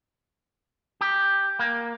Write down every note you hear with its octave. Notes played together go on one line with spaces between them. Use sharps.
G4
A#3